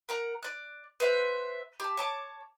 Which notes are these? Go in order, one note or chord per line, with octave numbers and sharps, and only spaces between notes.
A#4 F#5 A#5
D5 F#6
B4 C5 E5 F#5
G4 A5
C#5 A5 D6